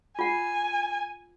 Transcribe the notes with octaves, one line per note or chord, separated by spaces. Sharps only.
F4 F#5 G#5